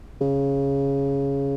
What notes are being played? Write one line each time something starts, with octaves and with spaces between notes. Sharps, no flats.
C#3